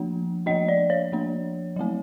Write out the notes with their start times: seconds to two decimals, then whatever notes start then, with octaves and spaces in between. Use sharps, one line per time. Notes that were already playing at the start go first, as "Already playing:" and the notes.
Already playing: F3 A#3 D4
0.46 F3 A#3 D4 D#5
0.68 D5
0.90 C#5
1.12 F3 A#3 D4
1.76 F#3 A3 C4